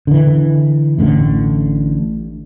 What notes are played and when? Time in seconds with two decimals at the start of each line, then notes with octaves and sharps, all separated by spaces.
0.07 D3 E3
0.98 A1 A2 D3